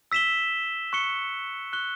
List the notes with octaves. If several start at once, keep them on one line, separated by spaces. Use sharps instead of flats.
E6 B6 E7 G7
C#6 F#6 C#7 G7
C#6 F#6 C#7 G7